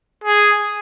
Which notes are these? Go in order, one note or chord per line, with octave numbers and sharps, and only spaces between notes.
G#4